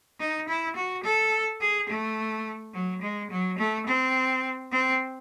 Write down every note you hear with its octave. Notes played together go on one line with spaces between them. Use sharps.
D#4
E4
F#4
A4
G#4
A3
F#3
G#3
F#3
A3
C4
C4